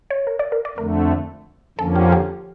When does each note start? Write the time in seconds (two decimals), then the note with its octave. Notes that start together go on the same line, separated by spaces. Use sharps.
0.10 C#5
0.27 A#4
0.39 D5
0.52 A#4
0.65 D5
0.77 F2 D3 A3 A#4
1.79 F2 D3 F3 A#3 C#4 A4
1.95 G4
2.12 G4